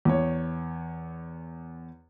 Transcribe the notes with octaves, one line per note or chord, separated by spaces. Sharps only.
E2 C#5